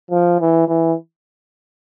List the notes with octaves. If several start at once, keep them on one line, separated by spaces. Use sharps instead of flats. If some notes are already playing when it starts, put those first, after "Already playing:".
F3
E3
E3